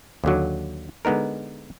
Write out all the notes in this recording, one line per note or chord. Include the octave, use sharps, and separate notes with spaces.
D#2 D3 F#3
D3 G#3 B3 D#4 A#4